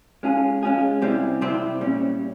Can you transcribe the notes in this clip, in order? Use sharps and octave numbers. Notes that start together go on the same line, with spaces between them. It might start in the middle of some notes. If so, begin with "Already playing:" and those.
G#3 C#4 F4 G#4
G#3 C#4 F4 G#4
C3 G3 C4 E4
C3 G3 C4 E4
A#2 G3 C#4